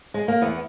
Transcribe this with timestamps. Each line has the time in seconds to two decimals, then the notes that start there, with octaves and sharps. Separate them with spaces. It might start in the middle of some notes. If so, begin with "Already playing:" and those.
0.14 G#3
0.28 A#3
0.41 E2 B3